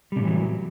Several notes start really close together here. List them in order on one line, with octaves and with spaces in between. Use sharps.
G3 C3 A2 E3 F#3